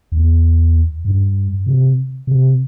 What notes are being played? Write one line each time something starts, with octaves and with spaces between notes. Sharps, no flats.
E2
G2
C3
C3